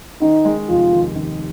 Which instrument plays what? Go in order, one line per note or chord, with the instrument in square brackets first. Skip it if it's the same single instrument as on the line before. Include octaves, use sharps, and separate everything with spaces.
[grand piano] D#3 [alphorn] D#4
[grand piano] G#3
[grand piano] F1 [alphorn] F4
[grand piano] D#2
D#3